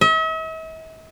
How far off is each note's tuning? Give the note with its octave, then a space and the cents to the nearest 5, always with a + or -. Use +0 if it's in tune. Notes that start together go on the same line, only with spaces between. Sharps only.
E5 -45